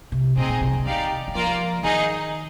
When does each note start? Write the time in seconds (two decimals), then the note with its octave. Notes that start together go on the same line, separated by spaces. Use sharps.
0.12 C3
0.37 A#2 C4 D#4 G#4 D#5 G#5
0.49 A#2
0.61 C3
0.73 D3
0.86 D#3 D#4 G4 D5 F5
1.28 D#3
1.35 F3 A#3 F4 A#4 D5
1.83 D#3 D#4 G#4 D#5